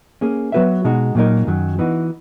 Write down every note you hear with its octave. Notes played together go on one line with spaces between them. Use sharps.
A#3 C#4 G#4
F#3 B3 F#4 B4 E5
B2 G#3 D#4 F#4
A#2 F#3 A#3 D#4 A#4
F#2 D#3 F#3
E3 B3 D#4 F#4